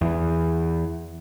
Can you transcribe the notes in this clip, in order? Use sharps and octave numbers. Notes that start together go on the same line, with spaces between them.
E2